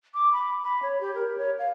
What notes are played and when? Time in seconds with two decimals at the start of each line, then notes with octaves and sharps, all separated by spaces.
0.14 D6
0.33 B5
0.64 B5
0.83 C#5
1.01 G4
1.15 A#4
1.38 C#5
1.59 F5